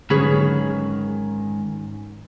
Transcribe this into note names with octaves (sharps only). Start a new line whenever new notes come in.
G#2 D3 D#3 F#3 C#4 G#4 B4